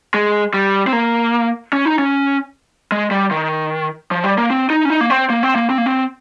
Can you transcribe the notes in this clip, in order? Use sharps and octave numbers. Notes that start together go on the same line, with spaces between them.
G#3
G3
C4
A#3
C#4
D#4
C#4
G#3
G3
D#3
F3
G3
A#3
C4
D#4
C#4
D#4
A#3
C4
A#3
C4
A#3
C4
A#3
C4